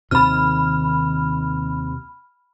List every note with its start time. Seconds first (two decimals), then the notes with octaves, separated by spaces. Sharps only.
0.11 D#2 C3 D#3 B5 F6